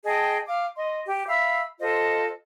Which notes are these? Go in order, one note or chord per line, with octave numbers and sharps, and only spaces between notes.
G#4 D#5 G5 A5
F5 D6
D#5 C6
G4
E5 F5 B5 E6
F4 A4 C5 D#5